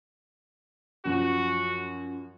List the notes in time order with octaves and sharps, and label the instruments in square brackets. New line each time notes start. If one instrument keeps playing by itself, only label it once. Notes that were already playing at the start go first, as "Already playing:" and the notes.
[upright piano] F#2 F3 F#5 [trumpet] F#4